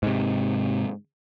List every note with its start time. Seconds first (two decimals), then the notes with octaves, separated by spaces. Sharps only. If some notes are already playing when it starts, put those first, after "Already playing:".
0.03 G#2 C3